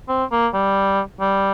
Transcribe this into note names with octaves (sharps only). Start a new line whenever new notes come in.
C4
A#3
G3
G3